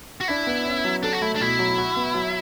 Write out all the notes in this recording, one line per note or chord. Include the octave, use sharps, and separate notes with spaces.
F#4
D4 E4
B3
C#4
F#3
D4 A4
F#4
A3 E4
D4
B2 E4
F#3
F#4
B3
F#3